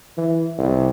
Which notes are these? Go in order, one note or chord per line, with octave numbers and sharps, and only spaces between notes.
E3
C2